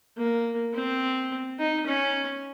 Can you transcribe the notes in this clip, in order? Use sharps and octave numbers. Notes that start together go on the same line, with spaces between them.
A#3
C4
D#4
C#4